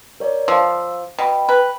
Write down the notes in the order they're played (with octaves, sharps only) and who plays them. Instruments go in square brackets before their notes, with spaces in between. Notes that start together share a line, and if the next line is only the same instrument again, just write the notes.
[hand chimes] A#4 C#5 D5
[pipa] F3 [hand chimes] F5 E6
[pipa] B2 [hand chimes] G5 B5
[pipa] B4